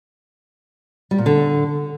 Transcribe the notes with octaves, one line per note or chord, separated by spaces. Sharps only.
G3
A#2
D3